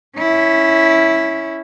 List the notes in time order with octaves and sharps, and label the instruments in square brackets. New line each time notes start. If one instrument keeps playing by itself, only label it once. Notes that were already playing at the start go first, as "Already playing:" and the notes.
[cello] C#4 E4